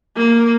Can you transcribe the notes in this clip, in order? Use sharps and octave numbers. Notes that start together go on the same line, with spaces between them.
A#3